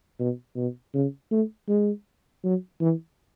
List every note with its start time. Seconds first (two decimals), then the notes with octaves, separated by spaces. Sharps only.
0.19 B2
0.56 B2
0.94 C#3
1.31 A3
1.68 G#3
2.44 F#3
2.81 E3